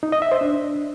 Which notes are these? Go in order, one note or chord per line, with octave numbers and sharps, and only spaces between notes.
D#4
D#5
E5
C5
D4